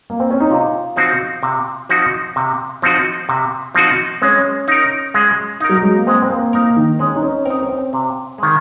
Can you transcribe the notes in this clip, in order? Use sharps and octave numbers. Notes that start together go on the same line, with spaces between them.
A#3
C4
C#4
D#4
C3 F4
F3 C4 D#4 F#4
C3
F3 C4 D#4 F#4
C3
F3 C4 D#4 F#4
C3
F3 C4 D#4 F#4
G#3 C#4
D#4 A#4
G#3
D#4 A#4
F#3
G#3
A#3
G#3 C4
C4
A#3
A#3 D#4 A#4
D#3
G#3 C#4
D#4
C#4
C4 D#4 A#4
C#4
C4
C3
D#3 G#3